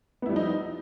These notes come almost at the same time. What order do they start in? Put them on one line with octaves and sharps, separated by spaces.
B3 E4 G3 F3 D#4